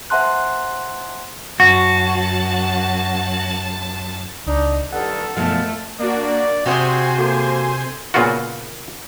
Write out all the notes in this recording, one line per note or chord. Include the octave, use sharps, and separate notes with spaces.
C5 E5 F#5 A5 C6 F#6
F#2 F#4 A5
C#2 D4 D#4
G2 D#3 A4 F#5
F#2 B2 F3 A3 A4 F5
A#3 D4 F#4 D5
C3 F#4 G#4 C5 G5 G#5 C6
A#3 F#4 A4
A#2 C#3 A#3 B3 F4 F#4